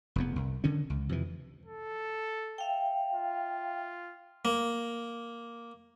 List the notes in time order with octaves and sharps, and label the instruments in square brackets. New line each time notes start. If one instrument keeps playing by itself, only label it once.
[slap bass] F1 E2 B3
C2
D3 D#3 C#4
C#2
F2 C3 E3
[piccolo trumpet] A4
[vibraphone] E5 F5 G5
[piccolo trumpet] F4
[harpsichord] A#3